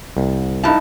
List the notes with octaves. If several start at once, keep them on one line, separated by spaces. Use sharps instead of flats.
C2
G2 D#4 E4 A5